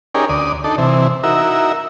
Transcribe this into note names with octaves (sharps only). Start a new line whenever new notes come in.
C#4 D#4 G4 G#4 A#4 D5
D2 D5 D#6
D4 D#4 A4
C3 E3
D#4 E4 F#4 A#4 E5